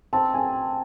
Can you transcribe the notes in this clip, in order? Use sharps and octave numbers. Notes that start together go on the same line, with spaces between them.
C4 A5
G#5